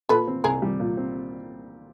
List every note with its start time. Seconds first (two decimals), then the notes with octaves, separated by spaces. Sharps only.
0.09 A#2 A4 B4
0.27 C4
0.44 C2 G#4 A#4
0.62 G3
0.80 A#2
0.97 C4